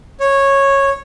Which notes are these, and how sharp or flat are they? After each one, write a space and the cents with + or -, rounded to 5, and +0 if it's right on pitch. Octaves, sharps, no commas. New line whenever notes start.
C#5 -10